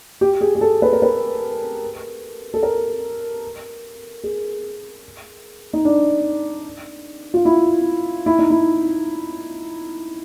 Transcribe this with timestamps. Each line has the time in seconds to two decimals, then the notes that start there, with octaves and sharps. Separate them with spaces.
0.21 G4
0.41 G#4
0.55 G#4
0.61 A4
0.82 B4
0.93 A#4
1.02 B4
2.54 A4
2.63 A#4
4.24 G#4
5.73 D#4
5.85 D4
7.34 F4
7.45 E4
8.26 E4
8.39 D#4
8.50 E4